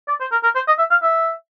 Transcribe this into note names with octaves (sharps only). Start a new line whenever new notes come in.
D5
C5
A#4
A#4
C5
D#5
E5
F5
E5